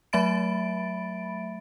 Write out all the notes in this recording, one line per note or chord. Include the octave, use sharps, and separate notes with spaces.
F#3 A3 E5 B5 A6 D7